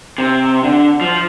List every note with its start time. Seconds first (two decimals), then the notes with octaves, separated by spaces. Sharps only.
0.18 C3
0.63 D3
1.01 F3